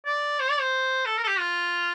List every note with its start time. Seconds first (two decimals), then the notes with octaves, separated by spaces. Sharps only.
0.06 D5
0.40 C5
0.50 D5
0.60 C5
1.06 A4
1.18 A#4
1.24 A4
1.28 G4
1.39 F4